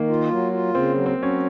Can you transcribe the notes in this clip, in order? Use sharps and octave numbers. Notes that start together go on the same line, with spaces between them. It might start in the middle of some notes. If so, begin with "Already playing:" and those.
Already playing: D#3 A#3
F4
F#3
F4
C#3 C4
F#3
C4
F#3
C#4